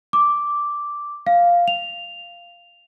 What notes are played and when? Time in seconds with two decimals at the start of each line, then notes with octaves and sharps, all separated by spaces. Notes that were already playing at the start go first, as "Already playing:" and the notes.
0.13 D6
1.27 F5
1.68 F7